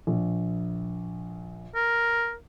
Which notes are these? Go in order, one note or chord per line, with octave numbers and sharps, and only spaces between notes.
A#1
A#4